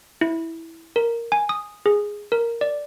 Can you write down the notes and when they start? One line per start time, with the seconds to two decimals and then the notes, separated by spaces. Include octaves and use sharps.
0.21 E4
0.96 A#4
1.32 G#5
1.49 D#6
1.86 G#4
2.32 A#4
2.61 D5